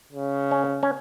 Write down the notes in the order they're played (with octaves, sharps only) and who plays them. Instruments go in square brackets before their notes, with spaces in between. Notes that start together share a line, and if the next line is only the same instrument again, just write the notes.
[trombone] C#3
[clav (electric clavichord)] C#4
C#4